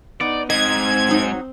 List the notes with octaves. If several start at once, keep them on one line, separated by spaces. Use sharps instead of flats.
B3 D#4 D5
G#2 C4 D#5 G#6
F#3 D#4